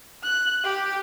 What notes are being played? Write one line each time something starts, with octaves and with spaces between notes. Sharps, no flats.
F#6
G4